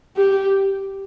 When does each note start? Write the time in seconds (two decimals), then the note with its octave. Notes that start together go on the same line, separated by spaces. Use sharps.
0.17 G4